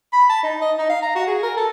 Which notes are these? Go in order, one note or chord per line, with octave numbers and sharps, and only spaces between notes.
B5
A5
D#4
D#5
D#4
F5
A#5
F#4
G#4
A#4
A4